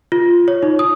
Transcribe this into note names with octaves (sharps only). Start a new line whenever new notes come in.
F4
C#5
D#4
D#6